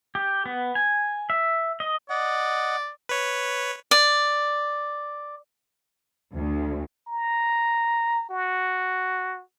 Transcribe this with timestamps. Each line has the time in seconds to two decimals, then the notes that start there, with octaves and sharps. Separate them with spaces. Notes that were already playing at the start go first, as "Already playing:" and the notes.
0.15 G4
0.46 B3
0.75 G#5
1.30 E5
1.80 D#5
2.10 D5 D#5 F#5
3.09 B4 C#5
3.91 D5
6.35 D2
7.08 A#5
8.30 F#4